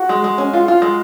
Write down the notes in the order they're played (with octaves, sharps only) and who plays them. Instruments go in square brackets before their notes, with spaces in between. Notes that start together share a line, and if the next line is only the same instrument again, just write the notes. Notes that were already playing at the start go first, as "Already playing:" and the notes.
Already playing: [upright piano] F#4
[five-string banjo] G#3
G#3
C#4
F4
F4
G#3